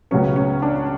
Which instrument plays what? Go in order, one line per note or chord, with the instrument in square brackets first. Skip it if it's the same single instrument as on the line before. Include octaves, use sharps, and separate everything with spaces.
[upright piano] C#2 C#3 F#3 B3 C#4
C#4
D4